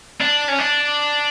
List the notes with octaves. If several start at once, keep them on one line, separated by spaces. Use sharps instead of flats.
D4
C#4
D4